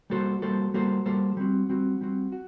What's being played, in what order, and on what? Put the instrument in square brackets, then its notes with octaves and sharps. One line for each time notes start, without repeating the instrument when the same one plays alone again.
[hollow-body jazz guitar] G3 A#3 F#4 A4 C5
G3 A#3 F#4 A4 C5
G3 A#3 F#4 A4 C5
G3 A#3 F#4 A4 C5
G3 C4 F#4
G3 C4 F#4
G3 C4 F#4
F#4